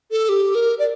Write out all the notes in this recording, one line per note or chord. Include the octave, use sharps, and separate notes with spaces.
A4
G4
A#4
D5